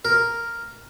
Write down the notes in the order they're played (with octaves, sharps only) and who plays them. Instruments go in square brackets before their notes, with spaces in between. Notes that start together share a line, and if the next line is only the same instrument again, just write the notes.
[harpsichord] A#4